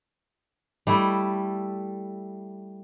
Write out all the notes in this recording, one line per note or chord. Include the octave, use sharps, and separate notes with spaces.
G3 A3 E4